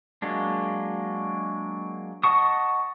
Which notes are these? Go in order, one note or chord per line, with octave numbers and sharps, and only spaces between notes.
F#3 G#3 A#3 D4
D#5 F#5 A5 C#6 D#6